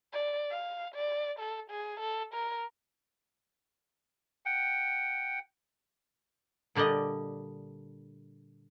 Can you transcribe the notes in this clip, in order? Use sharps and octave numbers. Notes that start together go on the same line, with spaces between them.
D5
F5
D5
A4
G#4
A4
A#4
F#5 G5
A#2 D3 G3 D4 D#5